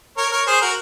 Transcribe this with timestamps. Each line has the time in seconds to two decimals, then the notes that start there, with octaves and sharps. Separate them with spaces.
0.17 A#4 C#5
0.32 A#4 C#5
0.47 G#4 C5
0.61 F#4 A#4